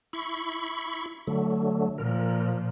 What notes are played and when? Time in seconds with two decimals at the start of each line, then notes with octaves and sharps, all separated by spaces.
0.13 E4 B5 C#6
1.27 D3 F#3 A3
1.98 A#2 F3 A#4